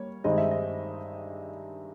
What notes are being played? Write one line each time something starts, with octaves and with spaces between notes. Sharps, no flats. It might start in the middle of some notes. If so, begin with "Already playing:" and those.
Already playing: G3 A#3 C#5
G2 D#3 G#3 C4 D#4 D#5
E5
D#5